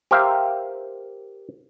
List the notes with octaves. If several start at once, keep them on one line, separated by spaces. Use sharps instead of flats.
G4 A#4 C5 E5 F5